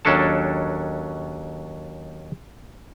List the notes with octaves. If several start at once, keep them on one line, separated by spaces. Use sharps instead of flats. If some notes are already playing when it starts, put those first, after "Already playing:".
D#2 F#3 C#4 D4 A4 A5